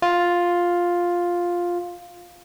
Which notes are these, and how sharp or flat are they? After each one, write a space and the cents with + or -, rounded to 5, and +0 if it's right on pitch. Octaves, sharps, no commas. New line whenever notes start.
F4 +5